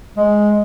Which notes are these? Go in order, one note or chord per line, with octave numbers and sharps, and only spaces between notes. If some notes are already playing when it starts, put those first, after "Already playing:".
G#3